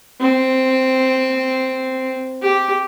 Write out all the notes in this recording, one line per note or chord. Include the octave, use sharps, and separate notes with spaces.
C4
G4